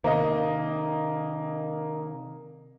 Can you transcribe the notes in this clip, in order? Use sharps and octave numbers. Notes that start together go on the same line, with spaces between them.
C3 D#3 A#3 D#5